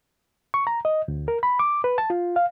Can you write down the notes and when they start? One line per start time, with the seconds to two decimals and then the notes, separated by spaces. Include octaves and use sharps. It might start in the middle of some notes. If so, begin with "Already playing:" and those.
0.54 C#6
0.67 A#5
0.85 D#5
1.08 D2
1.28 A#4
1.43 B5
1.59 D6
1.84 B4
1.98 A5
2.10 F4
2.36 F5